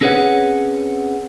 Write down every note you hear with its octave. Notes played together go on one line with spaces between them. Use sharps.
C4 C#4 G#4 B4 C#5 F#5